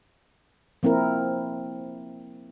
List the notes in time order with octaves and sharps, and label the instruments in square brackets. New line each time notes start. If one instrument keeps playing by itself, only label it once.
[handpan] F3 A#3 C4 E4 A#4